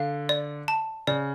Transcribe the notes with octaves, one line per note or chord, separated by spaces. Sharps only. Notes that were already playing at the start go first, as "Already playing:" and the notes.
Already playing: D3 F5
D5
A5
C#3 D5